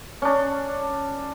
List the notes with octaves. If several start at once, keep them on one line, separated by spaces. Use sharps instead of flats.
C#4 D4